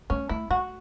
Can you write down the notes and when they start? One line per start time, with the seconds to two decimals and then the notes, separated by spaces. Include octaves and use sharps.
0.10 A3 C#4
0.29 A3 E4
0.50 A3 F#4